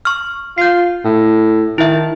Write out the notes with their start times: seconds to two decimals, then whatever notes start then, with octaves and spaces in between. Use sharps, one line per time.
0.05 C#6 F6
0.58 F4 G6 C7
1.05 A2
1.78 D#3 E4 E5